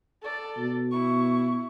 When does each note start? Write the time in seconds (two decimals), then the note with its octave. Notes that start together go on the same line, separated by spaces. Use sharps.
0.22 A4 D5
0.58 B2
0.91 E4 C#6